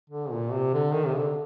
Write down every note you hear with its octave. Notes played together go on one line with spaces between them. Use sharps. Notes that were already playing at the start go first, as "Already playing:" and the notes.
D3
A#2
C3
D3
D#3
C3
D3